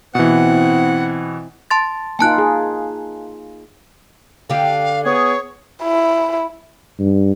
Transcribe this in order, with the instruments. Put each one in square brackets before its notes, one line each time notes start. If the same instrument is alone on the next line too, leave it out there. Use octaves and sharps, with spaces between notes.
[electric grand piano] B2 E3 [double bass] C4 E4 [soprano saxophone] F#5
[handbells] A5 C6 A6
[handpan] A#3 D#4 F4 [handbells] G#5 A5 F#6
[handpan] G#4
[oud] D3 G4 [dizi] F5
[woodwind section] B3 G#4 [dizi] C#5
[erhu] E4
[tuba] G2